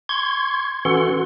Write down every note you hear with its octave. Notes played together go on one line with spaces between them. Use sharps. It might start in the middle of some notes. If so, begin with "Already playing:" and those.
C6 C#6 G#6
E3 C#4 F#4 A4 F#5 C6